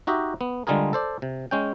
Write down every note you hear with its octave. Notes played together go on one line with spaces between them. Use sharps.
D#4 F#4 G4 D#5 E5
B3
D3 G3 G#3 F4 G#4 A#4
A4 C5 D5
C3
G#3 C#4 G5